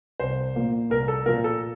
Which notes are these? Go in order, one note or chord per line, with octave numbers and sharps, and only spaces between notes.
C2 C5
A#2 F3 A#3
C2 A#4
A4
A#2 F3 A#3 A#4
A4